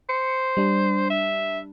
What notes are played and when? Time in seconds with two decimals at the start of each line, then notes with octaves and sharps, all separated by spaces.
0.09 C5 C#7
0.57 G3 D4
1.10 E5